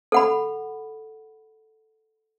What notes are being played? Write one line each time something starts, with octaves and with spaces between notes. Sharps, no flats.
A4 F#5 B5